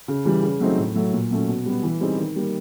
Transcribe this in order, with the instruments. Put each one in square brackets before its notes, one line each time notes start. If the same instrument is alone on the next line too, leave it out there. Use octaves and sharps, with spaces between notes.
[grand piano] C#3
E3 G3
C#3
F#3 A3 C4 D#4
A2
F#3 A3
A#2
F#3 A3 C#4
B2
G3 B3
E3
G3 C4 D#4 G#4
D#3
G3 A#3